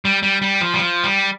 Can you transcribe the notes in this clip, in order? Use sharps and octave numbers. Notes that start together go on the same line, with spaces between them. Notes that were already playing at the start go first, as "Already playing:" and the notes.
G3
G3
G3
F3
G3
F3
G3